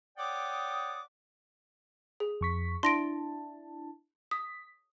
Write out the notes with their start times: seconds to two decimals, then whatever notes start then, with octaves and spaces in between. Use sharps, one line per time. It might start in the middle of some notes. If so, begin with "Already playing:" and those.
0.18 C#5 D5 F#5 G5 D6 D#6
2.20 G#4
2.41 F2 C#6 B6
2.83 D4 E4 A5 C6 A#6 D7
4.31 D#6 B6